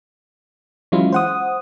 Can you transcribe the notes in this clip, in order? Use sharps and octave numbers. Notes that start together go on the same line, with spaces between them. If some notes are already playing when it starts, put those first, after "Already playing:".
E3 F#3 G#3 C#4 E4 F4
C5 F#5 D#6